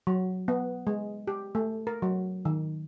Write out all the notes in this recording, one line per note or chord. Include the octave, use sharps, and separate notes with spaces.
F#3
B3
G#3
G4
A3
A#4
F#3
D#3